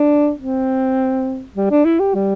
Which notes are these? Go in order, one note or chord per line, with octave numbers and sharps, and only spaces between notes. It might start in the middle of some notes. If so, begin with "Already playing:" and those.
Already playing: D4
C4
G3
D4
E4
G4
G3